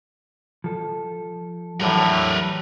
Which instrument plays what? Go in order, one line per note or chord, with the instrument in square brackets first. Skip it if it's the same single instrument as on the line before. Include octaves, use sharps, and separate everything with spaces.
[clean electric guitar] F3 A4
[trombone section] A2 D3 [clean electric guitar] E3 F#3 G3 [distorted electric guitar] A#4 B4